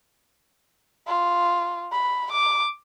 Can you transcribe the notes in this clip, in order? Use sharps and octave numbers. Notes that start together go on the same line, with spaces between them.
F4
B5
D6